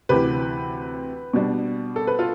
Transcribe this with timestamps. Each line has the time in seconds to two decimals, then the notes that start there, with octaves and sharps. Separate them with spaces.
0.09 D2 C3 E3 G4 B4
1.33 B2 G3 D4
1.96 A4
2.07 B4
2.19 F4 A4